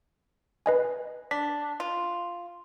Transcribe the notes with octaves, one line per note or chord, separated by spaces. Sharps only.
B4 D#5 G#5
D4 B6
F4